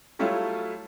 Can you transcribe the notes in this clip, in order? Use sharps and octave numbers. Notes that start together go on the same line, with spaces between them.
F#3 G3 A3 E4 F4 C#5